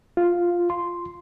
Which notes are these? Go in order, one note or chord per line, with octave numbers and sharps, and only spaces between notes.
F4
C6